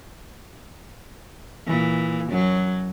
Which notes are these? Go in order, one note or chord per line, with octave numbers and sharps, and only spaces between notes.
A#2 E3
F#2 F#3